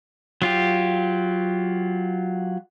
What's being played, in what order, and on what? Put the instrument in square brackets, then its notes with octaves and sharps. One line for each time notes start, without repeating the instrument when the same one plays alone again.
[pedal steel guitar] F#3 F4 G4